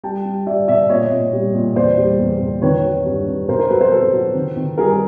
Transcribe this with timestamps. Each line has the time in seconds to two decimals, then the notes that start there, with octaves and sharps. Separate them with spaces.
0.03 G3 G5 A5
0.25 G3
0.47 G3 D5 E5
0.68 B2 D5 E5
0.89 A#2 C#5 D#5
1.11 A#2
1.33 G3
1.54 A#2
1.76 E2 C5 D5
1.98 G3
2.19 E2
2.41 E2
2.62 D#3 B4 C#5
2.84 F#3
3.06 G2
3.28 G2
3.49 B2 A#4 C5
3.59 A#4 C5
3.70 F#3 A4 B4
3.81 A#4 C5
3.92 F#3 A4 B4
4.13 F#3
4.34 D#3
4.56 D#3
4.78 G3 G#4 A#4